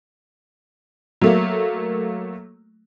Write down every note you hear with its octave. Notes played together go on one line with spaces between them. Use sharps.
F#3 A3 A#3